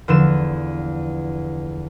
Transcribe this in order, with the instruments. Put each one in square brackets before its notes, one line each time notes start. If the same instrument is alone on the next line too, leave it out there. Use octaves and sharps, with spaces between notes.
[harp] E2 D3 F3 E7